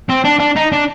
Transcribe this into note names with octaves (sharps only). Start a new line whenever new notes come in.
C4
D4
D4
D#4
D4